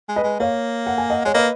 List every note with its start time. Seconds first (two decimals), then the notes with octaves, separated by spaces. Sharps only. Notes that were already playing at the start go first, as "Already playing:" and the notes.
0.09 G#3
0.16 B4 D#5
0.24 G#3
0.40 A#3 C#5 F5
0.87 F#5
0.98 G#5
1.10 D#5 F#5
1.25 G#3 C#5
1.34 A#3 B4 D#5